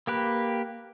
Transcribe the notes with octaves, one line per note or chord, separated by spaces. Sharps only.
A#3 G4 B4